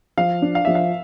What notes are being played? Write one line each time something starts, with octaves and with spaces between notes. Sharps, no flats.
F3 F5
D4
F5
F3 E5
F5